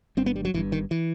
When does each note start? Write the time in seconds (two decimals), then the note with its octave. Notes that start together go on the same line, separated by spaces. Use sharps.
0.17 G1 G2 C4
0.26 B3
0.36 G3
0.45 F#3
0.54 G1 E3
0.57 G2
0.72 D#3
0.91 E3